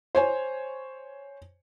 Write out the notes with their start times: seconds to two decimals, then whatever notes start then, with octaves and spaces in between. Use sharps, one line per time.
0.15 C5 C#5 G#5